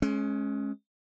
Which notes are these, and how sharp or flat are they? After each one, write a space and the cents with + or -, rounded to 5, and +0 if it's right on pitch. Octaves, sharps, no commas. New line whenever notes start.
G#3 +25 C#4 -15